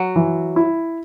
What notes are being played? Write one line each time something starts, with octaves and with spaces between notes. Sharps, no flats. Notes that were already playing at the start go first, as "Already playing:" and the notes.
Already playing: F#3
E3
E4